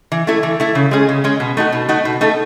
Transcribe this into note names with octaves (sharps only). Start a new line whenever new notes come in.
E3
A3 E4 A4
E3
A3 E4 A4
C#3
G#3 C#4 G#4
C#3
G#3 C#4 G#4
B2
A3 D#4 F#4
B2
A3 D#4 F#4
B2
A3 D#4 A4